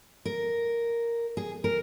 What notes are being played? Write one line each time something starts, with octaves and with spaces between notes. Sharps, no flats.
A#4
G#4
A#4